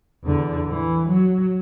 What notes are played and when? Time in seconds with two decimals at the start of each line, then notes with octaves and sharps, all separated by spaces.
0.24 E2 D3
0.70 E3
1.08 F#3